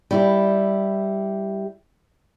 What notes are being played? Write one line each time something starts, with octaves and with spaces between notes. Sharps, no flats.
G3 E4 G4